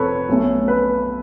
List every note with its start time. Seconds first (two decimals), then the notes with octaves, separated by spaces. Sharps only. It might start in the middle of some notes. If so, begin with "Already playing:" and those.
Already playing: F1 F2 F3 A4 B4 C#5
0.29 B1 B2 A3 C#4
0.68 B4